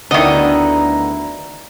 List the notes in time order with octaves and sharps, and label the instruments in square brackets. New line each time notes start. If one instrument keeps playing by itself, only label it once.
[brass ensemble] D2 A#5 [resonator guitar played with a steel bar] D3 B3 E4 [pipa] D#3 D#5